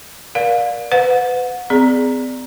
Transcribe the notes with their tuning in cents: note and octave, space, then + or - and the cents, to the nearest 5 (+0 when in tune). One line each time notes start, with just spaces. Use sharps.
A#4 +35 D5 +0 F5 +20
B4 +35 F#5 -35
C4 -45 G#4 +0 D5 +0